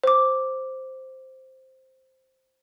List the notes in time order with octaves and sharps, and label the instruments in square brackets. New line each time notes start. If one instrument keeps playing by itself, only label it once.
[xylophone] C5 D6